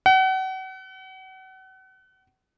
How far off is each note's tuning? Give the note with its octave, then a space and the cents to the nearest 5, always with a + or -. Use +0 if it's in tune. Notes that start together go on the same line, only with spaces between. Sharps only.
F#5 +35